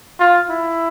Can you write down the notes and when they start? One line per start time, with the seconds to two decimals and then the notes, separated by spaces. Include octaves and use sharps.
0.19 F4
0.49 E4